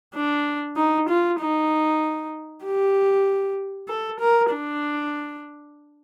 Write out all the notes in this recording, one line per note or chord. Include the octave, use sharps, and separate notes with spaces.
D4
D#4
F4
D#4
G4
A4
A#4
D4